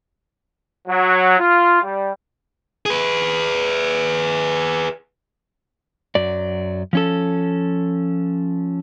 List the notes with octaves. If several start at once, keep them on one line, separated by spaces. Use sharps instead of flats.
F#3
F4
G3
G#4 B4
F#2 F#3 D5
F3 C#4 A4